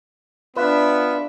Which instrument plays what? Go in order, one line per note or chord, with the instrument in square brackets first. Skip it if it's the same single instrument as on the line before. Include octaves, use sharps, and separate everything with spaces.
[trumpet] B3 [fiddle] D4 E5 [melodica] F4 [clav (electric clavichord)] B4